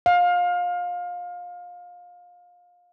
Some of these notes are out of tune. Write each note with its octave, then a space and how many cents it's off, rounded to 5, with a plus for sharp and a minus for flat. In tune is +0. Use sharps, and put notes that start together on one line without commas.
F5 +25